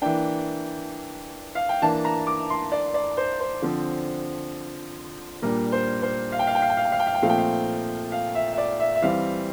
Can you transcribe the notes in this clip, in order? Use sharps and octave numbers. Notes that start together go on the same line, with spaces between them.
E3 A#3 D4 G5
F5
G5
E3 A#3 D4 A5
A#5
D6
C6
D5
D5
C5
C5
D3 F3 C4
A#2 G3 D4 A#4
C5
C5
F5
G5
F5
G5
F5
G5
F5
G5
F5
G5
F5
G5
A#2 F3 A3 C4 F5
G5
F5
F5
E5
E5
D5
E5
E5
E3 G3 C4 F5